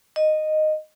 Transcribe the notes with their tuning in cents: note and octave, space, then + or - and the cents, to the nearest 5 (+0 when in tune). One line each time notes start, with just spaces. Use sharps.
D#5 -10